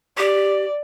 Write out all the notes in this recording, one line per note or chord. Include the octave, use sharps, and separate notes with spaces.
G4 D5